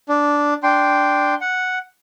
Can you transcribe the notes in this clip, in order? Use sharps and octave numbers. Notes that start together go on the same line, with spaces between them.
D4
D4 G5 C6
F#5